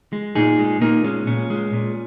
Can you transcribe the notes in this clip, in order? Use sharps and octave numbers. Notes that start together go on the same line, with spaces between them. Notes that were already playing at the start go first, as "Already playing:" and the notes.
G#3
A#2 D#4 G#4
G#3
A#2 A#3 D#4
G#3 C#4
A#2 C#4
G#3
A#2